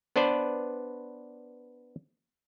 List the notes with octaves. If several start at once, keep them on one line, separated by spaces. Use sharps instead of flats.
B3 D4 B4 C5 D5